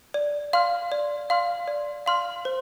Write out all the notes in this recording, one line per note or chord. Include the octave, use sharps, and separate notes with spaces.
D5
F5 C6 F6
D5
F5 C6 F6
D5
F5 C6 F6
C5